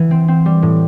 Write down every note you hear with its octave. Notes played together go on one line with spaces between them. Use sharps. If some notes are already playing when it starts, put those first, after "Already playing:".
Already playing: E3
C4
C4
G3
A2